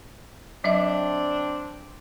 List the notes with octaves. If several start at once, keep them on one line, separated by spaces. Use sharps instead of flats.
F#3 C4 D4 D5 E5